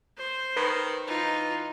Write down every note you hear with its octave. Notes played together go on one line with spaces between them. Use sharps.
C5
D#3 B4
E3 D#4 F4